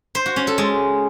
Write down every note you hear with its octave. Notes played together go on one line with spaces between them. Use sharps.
C5
F#4
C#4
A4
G#3